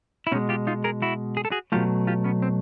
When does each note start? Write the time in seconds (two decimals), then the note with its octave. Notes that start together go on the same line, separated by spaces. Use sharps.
0.27 E4
0.32 B2 C#4 D#4
0.35 G#3
0.49 F4 G4
0.67 D#4 F4
0.84 G#4 A#4
1.02 E4 F#4
1.37 G#4
1.45 A4
1.51 F#4 G#4
1.72 B2 F#3 A3 F4 G4
2.07 F4 G4
2.24 B3 C#4
2.42 C4